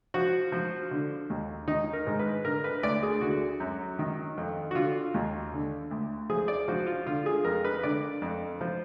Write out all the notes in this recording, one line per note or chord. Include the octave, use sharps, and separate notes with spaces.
F3 F#4
F3
D3
D#2
D#3 D#4
A#4
G#2
B4
D3 A#4
B4
D2 D5
G#4
D3 F#4
F#2
D#3
F2
F#4
D3 F4
D#2
D3
D2
F3 G#4
D5
F3 F#4
F4
D3 F4
G#4
F2 A#4
B4
D3 D5
F2
F3